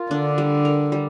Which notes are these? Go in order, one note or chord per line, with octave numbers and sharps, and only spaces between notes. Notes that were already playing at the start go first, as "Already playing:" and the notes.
Already playing: F4 A#4
D3 D4
G3
A#4
G3